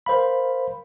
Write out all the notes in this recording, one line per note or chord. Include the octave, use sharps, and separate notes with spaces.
A#4 C5 F5 B5